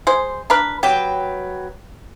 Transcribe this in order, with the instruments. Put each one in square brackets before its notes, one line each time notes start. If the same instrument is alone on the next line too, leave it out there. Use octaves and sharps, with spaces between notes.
[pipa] G#3 C5
D4 A#4 B4
[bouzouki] F#3 B4 G5 [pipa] G4